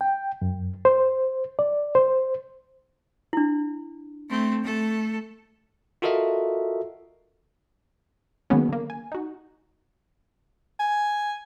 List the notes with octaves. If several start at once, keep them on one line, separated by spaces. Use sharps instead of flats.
G5
F#2
C5
D5
C5
D4 E4
A3 C4
A3 A4
F4 F#4 A4 A#4 D#5 E5
D#3 F#3 G#3 A#3 B3 C#4
D3 A#3
G#5
D#4 F#4
G#5